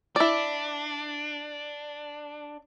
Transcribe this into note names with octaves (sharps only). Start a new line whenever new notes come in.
D4 E4 D5